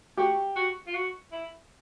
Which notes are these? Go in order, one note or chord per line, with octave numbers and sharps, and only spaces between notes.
F#4 G4
F#4
F4
F#4
E4